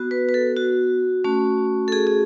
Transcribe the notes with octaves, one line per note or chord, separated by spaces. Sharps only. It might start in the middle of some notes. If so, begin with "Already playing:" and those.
Already playing: B3 F#4
B4
B4
A4
F#4
A3 C#4 F#4
A4
G#4
G#4